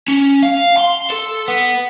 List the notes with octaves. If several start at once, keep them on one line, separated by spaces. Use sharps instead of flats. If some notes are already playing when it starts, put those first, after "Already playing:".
C#4
F5
C6
A4
B3